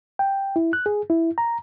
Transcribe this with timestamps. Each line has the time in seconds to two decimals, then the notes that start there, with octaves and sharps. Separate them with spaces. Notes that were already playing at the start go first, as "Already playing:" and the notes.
0.19 G5
0.56 E4
0.73 F#6
0.86 G#4
1.10 E4
1.38 A#5